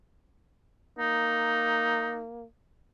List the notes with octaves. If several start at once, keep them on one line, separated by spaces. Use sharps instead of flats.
A#3 D#4